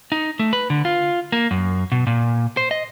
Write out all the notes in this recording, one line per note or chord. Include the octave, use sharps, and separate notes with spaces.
D#4
A3
B4
D3
F4
A#3
F#2
B2
A#2
C5
D#5